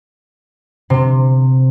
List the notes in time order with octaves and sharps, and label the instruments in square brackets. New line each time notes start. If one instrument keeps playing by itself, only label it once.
[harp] C3